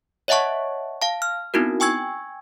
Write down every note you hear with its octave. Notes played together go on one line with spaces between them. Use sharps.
C#5 D#5 E5 F#5 A5 C#6
F5 A5
F6
B3 C4 D#4 E4 F#4 A#4
G5 G#5 C#6 E6 G#6